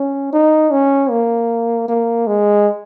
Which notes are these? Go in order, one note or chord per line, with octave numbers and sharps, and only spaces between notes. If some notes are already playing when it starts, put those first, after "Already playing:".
Already playing: C#4
D#4
C#4
A#3
A#3
G#3